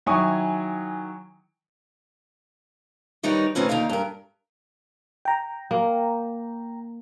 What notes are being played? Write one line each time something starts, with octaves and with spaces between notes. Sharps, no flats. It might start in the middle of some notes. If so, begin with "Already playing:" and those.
D#3 F#3 E4 G#5 C#6 D#6
D#3 G3 D#4 A#4 B4 C#5
A2 D#3 C4 C#4 B4
D#2 D3 D#4 F5
G2 A#4
G5 A#5
A#3